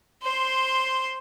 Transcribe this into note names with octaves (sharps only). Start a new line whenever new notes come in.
C5 C6